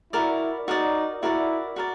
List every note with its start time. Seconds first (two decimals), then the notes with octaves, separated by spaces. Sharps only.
0.13 E4 F#4 A#4 D5
0.67 D#4 F#4 A#4 D5
1.22 E4 F#4 A#4 D5
1.76 F#4 A#4 D5